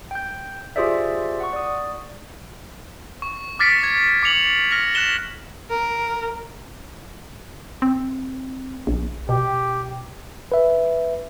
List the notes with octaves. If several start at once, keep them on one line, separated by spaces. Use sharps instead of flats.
G5 G6
F4 G4 G#4 C5 D5 E5
F#5 C#6
D5 D#6
C#6
D6 F6 A6 B6 C#7 D7
G#6
D6 C#7 F7 F#7
F6 A#6 C#7 F7
F#6 A6 E7 G7
A#4
C4
A#1
B2 G4
B4 E5